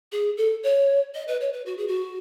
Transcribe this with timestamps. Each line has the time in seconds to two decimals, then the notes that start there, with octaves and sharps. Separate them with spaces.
0.12 G#4
0.37 A4
0.63 C#5
1.15 D#5
1.28 B4
1.41 C#5
1.53 B4
1.66 F#4
1.77 G#4
1.88 F#4